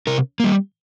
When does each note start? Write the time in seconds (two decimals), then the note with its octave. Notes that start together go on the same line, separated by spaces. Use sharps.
0.07 C3 A#4
0.40 G3 A#3